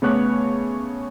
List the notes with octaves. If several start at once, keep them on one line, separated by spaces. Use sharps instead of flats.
C#3 A3 B3 C#5 D6 F#6